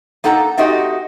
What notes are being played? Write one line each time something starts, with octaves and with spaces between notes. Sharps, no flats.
A#3 D#4 A4 F#5 A#5
A3 C4 D#4 F#4 G4 D#5